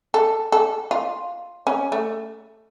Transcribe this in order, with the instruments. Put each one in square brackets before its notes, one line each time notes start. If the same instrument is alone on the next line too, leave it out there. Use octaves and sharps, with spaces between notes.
[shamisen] A4
A4
F4
C#4
A3